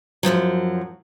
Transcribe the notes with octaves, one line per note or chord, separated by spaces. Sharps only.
F#2 C3 F3 F#3